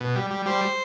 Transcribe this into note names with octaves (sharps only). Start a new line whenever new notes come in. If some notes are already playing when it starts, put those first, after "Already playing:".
B2
G3
G3
G3 C5